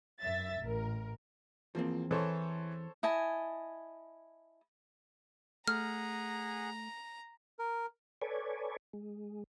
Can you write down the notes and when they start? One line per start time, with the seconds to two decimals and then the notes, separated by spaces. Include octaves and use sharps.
0.21 F#2 E5 A6
0.60 A1 A#4
1.75 E2 F3 A#3 C4
2.11 E3 A4 C5 C#5
3.03 E4 D#5 G#5 A5
5.68 A3 G#4 F#5 G#5 A#5 F6
7.59 A#4
8.22 A4 B4 C#5 D5 G#5
8.93 G#3